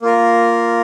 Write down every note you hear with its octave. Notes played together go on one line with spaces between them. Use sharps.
A#3 F4 A#4